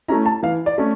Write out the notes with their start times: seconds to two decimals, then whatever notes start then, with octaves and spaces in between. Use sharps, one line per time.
0.08 A3 C#4 E4 A#5
0.26 A5
0.43 E3 F5
0.66 D5
0.78 A3 C#4